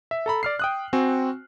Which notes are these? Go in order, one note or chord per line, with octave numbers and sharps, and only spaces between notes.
E5
A4 A#5 B5
D5 F6 C7
G5 D#6 F#6
C4 F#4 G#5